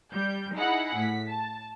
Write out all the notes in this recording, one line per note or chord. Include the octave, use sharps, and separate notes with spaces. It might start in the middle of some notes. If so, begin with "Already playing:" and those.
G3 G6
D#4 E4 G#4 F#5 B5
A2 B6
A5